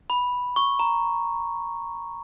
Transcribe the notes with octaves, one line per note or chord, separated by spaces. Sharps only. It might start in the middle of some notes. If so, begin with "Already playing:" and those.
B5
C#6
A#5